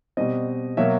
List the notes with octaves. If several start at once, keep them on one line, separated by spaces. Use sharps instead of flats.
B2 G3 C4 D#5
B2 F#3 A#3 E5